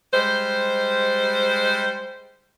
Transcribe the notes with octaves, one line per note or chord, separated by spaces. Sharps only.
G3 G#3 C5